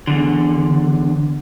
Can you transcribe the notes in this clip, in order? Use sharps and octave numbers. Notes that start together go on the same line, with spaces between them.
E2 D3